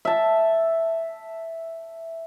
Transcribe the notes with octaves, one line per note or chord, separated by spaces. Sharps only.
E5 A5